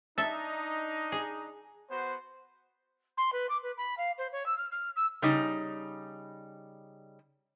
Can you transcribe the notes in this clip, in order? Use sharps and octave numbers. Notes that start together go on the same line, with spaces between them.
D4 D#4 A4 E5
G#4
B3 F#4 C5
C6
B4
D6
B4
B5
F5
C5
C#5
E6
F6
F6
E6
C#3 G3 D#4